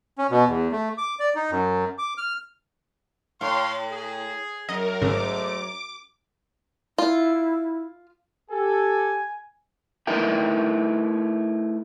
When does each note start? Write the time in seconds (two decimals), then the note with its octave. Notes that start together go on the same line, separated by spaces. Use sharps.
0.18 C#4
0.30 B2
0.47 E2
0.72 A3
0.98 D6
1.20 D5
1.36 D#4
1.51 F#2
1.98 D6
2.18 F6
3.41 A2 C#5 F5 C6
3.92 G#4
4.69 F#2 A#4 D#5
5.01 G#1 G#2 C#3 A3 D6
6.98 E4 F4
8.51 G4 A4 G#5
10.07 A3 D#4 E4 A#4 B4 G5